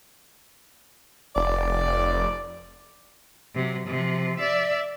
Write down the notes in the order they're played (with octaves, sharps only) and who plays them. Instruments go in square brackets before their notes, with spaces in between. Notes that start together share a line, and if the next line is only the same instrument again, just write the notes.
[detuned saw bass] F1 [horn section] D5
[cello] C3 F#3
C3 F3
D5 E5